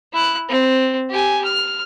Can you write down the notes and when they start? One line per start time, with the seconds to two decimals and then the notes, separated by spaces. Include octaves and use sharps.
0.13 E4 F#6
0.49 C4
1.10 G4 G#5
1.44 F6